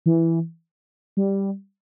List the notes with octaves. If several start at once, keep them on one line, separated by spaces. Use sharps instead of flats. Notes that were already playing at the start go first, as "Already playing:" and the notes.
E3
G3